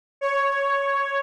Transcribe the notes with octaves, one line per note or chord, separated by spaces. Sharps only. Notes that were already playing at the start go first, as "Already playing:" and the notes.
C#5